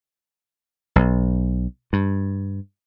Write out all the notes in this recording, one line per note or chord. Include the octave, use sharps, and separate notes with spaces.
B1
G2